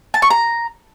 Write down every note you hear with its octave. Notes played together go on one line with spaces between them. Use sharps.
A5
C#6
A#5